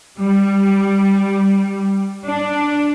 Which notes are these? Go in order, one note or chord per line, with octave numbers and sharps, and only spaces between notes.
G3
D4